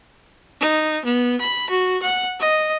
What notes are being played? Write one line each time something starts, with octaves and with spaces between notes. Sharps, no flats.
D#4
B3
B5
F#4
F#5
D#5